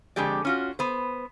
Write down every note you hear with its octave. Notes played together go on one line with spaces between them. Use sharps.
F2 D3 G#3 G4 D5
C#4 F4 F#4
B3 C5